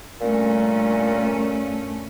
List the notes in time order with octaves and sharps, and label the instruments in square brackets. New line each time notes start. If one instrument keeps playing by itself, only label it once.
[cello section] G2 A3 C#4 [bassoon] A#2